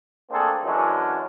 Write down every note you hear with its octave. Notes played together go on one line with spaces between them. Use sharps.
A3 A#3 C4 D4 G#4 A4
F#2 E3 F#3 G#3 C#4 D4